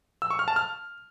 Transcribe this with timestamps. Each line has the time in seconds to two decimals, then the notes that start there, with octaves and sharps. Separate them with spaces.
0.22 E6
0.30 C#6
0.39 F6
0.48 A5
0.56 F6